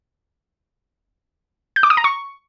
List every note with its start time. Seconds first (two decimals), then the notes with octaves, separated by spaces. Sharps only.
1.76 G6
1.83 D6
1.90 D#6
1.97 A#5
2.04 C#6